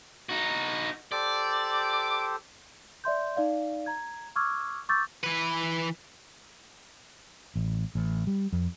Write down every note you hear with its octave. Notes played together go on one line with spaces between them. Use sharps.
D#4 F#4
G4 A4 C5 D5
D5 E5 C6 G6
D#4 D5 F5
A#5 G#6
C#6 D6 E6 F6 G#6
C#6 D6 E6 G6 A6
E3 B4
A1
A1
G3
F2